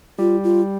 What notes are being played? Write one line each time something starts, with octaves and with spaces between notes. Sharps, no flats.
G3 F4
F4